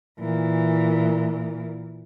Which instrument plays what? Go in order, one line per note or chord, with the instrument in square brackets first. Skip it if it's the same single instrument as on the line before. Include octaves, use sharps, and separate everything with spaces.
[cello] A#2 E3